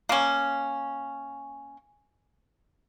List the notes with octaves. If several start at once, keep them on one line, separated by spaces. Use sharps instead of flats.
A#3 C#4